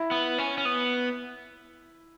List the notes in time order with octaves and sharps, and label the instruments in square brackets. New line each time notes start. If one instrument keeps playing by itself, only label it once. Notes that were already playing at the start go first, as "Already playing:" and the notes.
Already playing: [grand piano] E4
[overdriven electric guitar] B3
C#4
C#4
B3